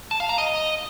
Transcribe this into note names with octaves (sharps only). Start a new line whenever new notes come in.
A5
F5
A#5
D#5